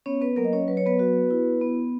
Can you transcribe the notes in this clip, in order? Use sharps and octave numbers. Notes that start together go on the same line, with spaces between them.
B3 C#4 C#5
B3 B4
F#3 A#3 A#4
D#5
C#4 C#5
F#3 B4
C#5
B3 B4
F#4
E4
B3